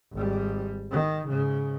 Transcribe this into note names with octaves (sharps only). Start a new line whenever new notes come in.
G#1 G3
D#3
G#2 C#3